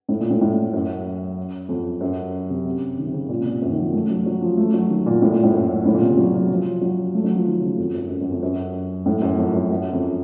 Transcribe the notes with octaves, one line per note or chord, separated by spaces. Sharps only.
A2
A#2
A2
A2
F#2
F2
F#2
C3
C3
D#3
C3
C#3
A#2
C3
A#2
F#2
D#3
F3
A3
F#3
F#3
F3
A3
F#3
D#3
A#2
A2
A#2
A2
F#2
A2
A#2
C3
C#3
F#3
F#3
F3
F#3
A3
F#3
F3
D#3
C#3
F2
F#2
F#2
F#2
F2
F#2
A2
F#2
F2
F#2
F#2
F2